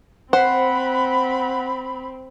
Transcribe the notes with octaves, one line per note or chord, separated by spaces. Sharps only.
C4 C5 F#5 B5